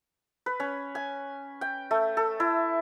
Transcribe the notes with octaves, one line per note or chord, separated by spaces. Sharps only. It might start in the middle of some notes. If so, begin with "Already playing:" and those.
B4
C#4
G#5
G5
A3
A4
E4